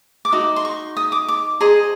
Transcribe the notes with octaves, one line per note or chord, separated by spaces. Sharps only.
D6
D#4 F#4
C6
C#6
D#6
D6
D6
G#4 C5 D#5 A#5